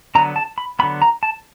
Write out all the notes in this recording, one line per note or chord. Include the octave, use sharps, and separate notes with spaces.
D3 F#3 B3 A#5
A5
B5
D3 F#3 B3 B5
A#5
A5